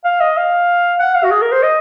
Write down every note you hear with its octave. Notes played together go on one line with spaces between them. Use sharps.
F5
D#5
F5
F#5
F5
F#4
G#4
A#4
C5
D#5